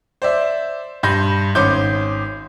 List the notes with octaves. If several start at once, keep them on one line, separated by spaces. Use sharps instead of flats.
C5 D5 E5
G2 B5 C6 G6 A#6
G#1 C#4 C6 D6 G6